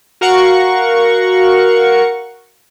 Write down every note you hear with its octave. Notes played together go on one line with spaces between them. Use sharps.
F#4 A#4 F5 F#5 C#6